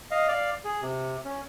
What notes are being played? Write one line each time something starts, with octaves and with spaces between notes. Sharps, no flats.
D#5 F5
D5 F5
G#4
C3
C#4